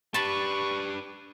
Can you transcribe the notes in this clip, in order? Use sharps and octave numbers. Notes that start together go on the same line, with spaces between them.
D4 G4 B4 A5 B5 C#6